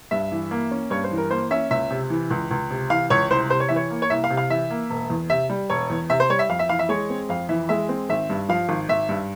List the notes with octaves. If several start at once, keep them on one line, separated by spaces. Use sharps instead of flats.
G2 E5
E3
A#3
C#4
G2 C#5
C5
E3
A#4
A#3 C5
C#4 E5
C#2 E5
C3
E3
C#2
C#2
C3
E3 F5
C#2 C#5
C2 C5
C3 C5
C#5
E3 E5
C#5
A#3
C#5
C2 E5
F5
C3
F5
E3 E5
A#3
E1
E2
C3 E5
G3
E1 C#5
E2
C3 E5
C5
G3 C#5
E5
F2 F5
E5
E3 F5
E5
G#3 C#5
C4
F2 F5
E3 E5
G#3 E5
C4
G#1 E5
G2
F3 F5
G#1
G#1 E5
G2